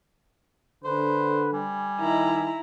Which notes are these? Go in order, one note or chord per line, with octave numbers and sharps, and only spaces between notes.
D3 B4 C5
G3 G#5
D#3 E4 A#5